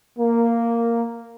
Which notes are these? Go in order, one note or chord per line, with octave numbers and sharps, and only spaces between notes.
A#3